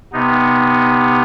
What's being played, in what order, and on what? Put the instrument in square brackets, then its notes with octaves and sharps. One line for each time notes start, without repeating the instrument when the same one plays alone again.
[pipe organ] C3 B3 D#4